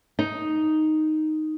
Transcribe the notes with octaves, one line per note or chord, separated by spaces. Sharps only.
D#4